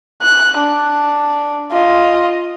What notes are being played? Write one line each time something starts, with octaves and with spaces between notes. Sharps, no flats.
F#6
D4
F4 D#5